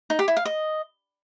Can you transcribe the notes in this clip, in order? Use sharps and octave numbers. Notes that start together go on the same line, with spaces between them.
D#4
G4
E4
F5
D#5